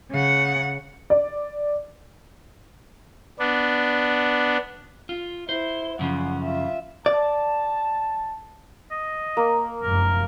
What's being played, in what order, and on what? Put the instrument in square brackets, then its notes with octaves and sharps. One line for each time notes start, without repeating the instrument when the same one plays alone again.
[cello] C#3 F#5
[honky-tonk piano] D5
[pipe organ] B3 D4
[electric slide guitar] F4
[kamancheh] E4 [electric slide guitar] C5
[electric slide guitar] F#2 C#3 F3 [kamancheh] F#5
[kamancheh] F4 E5
[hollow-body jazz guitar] D5 [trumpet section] A5
[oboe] D#5
[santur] A#3
[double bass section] F1 F#2 [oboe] A#4